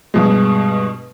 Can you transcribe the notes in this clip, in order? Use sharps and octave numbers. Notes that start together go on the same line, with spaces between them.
G2 B2 G#3